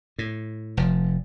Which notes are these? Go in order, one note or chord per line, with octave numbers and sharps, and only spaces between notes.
A2
F1 F3